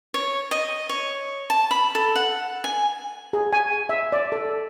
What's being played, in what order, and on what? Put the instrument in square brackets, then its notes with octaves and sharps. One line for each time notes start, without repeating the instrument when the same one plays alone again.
[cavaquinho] C#5
D#5
C#5
A5
B5
A4
F#5
G#5
[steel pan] G#4
G#5
E5
D5
A4